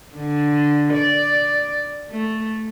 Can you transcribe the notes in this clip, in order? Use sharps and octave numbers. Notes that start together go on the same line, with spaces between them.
D3
D5
A3